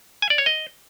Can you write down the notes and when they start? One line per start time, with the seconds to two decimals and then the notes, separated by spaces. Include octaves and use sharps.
0.22 G#5
0.30 D5
0.38 C#5
0.46 D#5